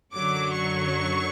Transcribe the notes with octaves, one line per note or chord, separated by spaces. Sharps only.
F#2 D3 F#3 D6
C#6